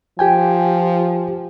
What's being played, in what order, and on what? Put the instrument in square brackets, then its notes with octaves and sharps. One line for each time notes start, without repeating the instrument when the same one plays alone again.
[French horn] F3 [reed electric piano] G4 G5 G#5